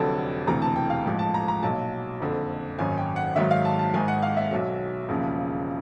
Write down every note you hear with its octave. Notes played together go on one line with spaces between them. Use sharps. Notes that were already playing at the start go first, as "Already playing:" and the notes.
Already playing: F1 F2 D3 F#3 A5
E1 D2 C3 E3 A#5
A5
G5
F5
A1 G#2 F3
A5
A#5
A#5
B1 A#2 F#3 A5
F#1 F2 D3
G#1 F#2 D#3 F#3 G#5
G5
F#5
G#1 G#2 D#3 F#3 E5
F5
A5
A5
G#1 G#2 D#3 G#5
F#5
F5
E5
B1 B2 F#3
E1 D#2 C#3 F3